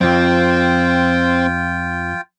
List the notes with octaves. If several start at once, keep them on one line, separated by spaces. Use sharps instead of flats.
F2 F3 C4 F4 G5